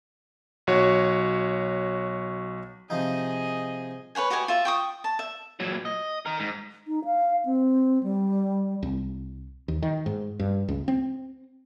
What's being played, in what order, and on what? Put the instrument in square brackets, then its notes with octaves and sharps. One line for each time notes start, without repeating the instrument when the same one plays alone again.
[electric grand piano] B1 F#4 C#5
[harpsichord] C3 F3 D#4 [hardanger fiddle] G#4 D#5
[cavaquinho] B4 C#5 F#5 G#5
F#4 G4 D#5 G#5
F4 E5
G5 C#6 D#6
A5
E5
[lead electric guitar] A#2 F#3
D#5
D#4 A#4
G#2
[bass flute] D#4
F5
C4
G3
[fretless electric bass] C2
D#2
D#3
G#2
G2
C#2
C4